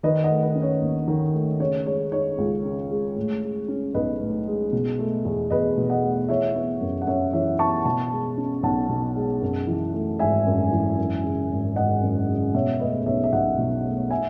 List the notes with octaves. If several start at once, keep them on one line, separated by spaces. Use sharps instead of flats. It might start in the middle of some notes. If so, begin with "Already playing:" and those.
D#3 B4 D#5
D#5 F#5
A3
B4
C#4
C#5
D#2
D#3
A3
C#3 C#5
G#3 C#5
D#4 C#5
C#2
C#3
G#3
A2
G#3
C#4
B1 B4 D#5
A2
G#3
B2
A3
E2
E2 B4 D#5
B2
D#5 F#5
A3
E3 C#5 E5
B3
F#2
F#5
F#2 C#5 E5
E3 C#5 E5
B3 A5 C#6
B2 A5 C#6
G#3
C#4
B1 F#5 A5
B2
G#3
F#2
E3
A3
G#1 E5 G#5
F#2
E3
F#2
C#3
G#1
G#1 D#5 F#5
F#2
C#3
B2 C#5 E5
A3 B4 D#5
B1 C#5 E5
E5
B1 D#5 F#5
B2
A3
E5 G#5